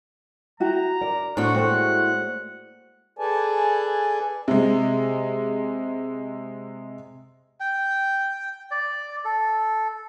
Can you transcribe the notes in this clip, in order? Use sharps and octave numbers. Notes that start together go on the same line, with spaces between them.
E4 F#4 G5 A#5
A#4 D5
A2 D4 E4 F#4 C5 F#5
G#3 A#3 A4 C5 G5
G#4 A4 B4 D5 G#5 A5
C3 G#3
G5
D5
A4